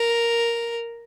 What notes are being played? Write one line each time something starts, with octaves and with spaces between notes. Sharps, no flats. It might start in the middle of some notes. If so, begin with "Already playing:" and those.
Already playing: A#4